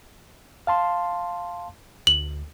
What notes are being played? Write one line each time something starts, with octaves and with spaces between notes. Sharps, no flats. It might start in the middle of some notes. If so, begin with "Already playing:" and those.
F5 A5 C6
D2 F#7